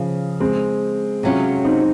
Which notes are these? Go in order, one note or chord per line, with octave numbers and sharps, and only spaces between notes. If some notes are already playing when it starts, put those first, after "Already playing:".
Already playing: C#3 F3
G#3 C4
C3 F#3 C#4 F4
C4 D#4